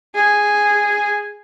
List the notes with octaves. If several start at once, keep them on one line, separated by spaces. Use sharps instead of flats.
G#4